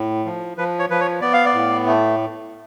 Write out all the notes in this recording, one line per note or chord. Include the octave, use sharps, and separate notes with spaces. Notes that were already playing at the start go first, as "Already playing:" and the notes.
Already playing: A2
F3
F3 B4
C#5
F3 B4
C#5
B3 D5
F5
D5
A2
A3